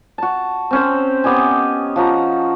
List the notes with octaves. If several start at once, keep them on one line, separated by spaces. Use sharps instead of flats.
F#4 A5
C4 C#4 C5
B3 G4 D#5 G#5
F3 F#4 A#5